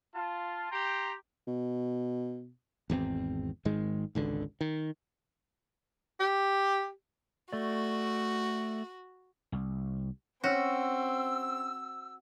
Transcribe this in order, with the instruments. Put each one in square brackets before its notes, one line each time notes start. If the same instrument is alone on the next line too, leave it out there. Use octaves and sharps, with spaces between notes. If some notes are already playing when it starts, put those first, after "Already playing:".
[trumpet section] F4 A5
G4 G5 A#5 C6
[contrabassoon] B2
[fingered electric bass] G#1 E2 B2 C4
G#1 G#2 D#3 G#3
G#1 C#2 D3
D#3
[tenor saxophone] G4
[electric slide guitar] A3 D5 [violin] F#4
[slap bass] C2
[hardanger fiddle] C4 [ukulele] C#4 [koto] F#4 [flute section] E6